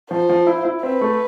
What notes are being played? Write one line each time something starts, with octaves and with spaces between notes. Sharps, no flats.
F3 C5
F3
E4
F4
E4
C4 B4
A3